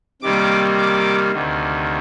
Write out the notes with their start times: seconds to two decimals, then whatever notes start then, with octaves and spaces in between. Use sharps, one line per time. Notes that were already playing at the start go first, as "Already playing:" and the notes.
0.22 C3 D#3 G3 A#3 D6
0.77 D6
1.32 D2 C3 D#3